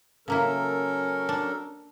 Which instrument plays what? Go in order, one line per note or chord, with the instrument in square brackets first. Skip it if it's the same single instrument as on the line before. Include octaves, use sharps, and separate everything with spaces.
[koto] C#3 A#3 E4 [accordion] F#3 A4 A#4 [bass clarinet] C#4
[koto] D4